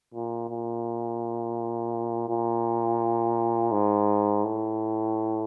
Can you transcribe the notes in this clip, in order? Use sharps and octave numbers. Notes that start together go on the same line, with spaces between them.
A#2
A#2
A#2
G#2
A2